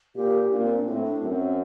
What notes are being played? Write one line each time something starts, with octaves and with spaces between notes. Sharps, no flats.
A#2 G4
A#2 D4
A#3
C4
D4
A2 C4
D4
F#2 C4